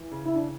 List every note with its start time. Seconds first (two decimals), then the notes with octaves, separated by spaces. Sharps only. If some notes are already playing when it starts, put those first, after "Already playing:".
Already playing: E3
0.11 C#3
0.25 E4
0.34 D4